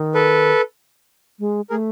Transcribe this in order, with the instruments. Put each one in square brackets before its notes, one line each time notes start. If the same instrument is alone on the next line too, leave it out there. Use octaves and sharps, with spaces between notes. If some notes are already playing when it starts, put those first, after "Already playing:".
Already playing: [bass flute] D#3
[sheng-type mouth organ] A4 B4
[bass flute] G#3
[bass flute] A3 [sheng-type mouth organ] G#4 A#4